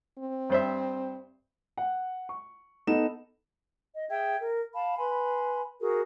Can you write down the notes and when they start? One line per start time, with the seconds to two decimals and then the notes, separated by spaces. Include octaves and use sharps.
0.19 C4
0.50 G2 C5 E5
1.77 F#5
2.29 C#6
2.87 B3 D#4 A4 E7
3.95 D#5
4.09 G#4 E5 G5 G#6
4.39 A#4
4.73 F5 A5 B5
4.97 B4 G#5 B5 C6
5.80 F#4 G#4 A#4